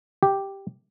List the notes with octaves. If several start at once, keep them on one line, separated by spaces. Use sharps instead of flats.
G4